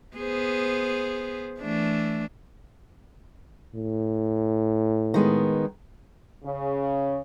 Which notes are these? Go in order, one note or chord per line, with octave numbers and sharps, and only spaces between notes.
B3 G#4 C5
E3 A3 D4
A2
D#3 G#3 B3
C#3